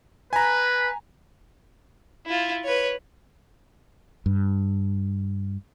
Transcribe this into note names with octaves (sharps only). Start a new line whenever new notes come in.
B4 G#5 A#5
E4 F4
B4 C#5
G2